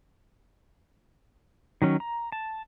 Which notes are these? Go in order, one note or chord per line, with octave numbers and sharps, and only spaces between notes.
D#3 F#3 C#4
A#5
A5